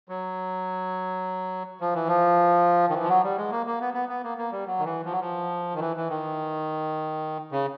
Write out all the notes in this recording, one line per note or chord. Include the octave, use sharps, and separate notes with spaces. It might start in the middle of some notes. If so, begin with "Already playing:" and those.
F#3
F3
E3
F3
D#3
E3
F3
F#3
G3
G#3
A#3
A#3
B3
B3
B3
A#3
A#3
G3
F#3
D#3
E3
F3
F#3
F3
D#3
E3
E3
D#3
C#3